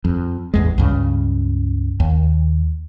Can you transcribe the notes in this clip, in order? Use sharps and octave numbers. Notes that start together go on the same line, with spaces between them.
F2
A1 E2 G#3
C#2 G2 C#3
D#2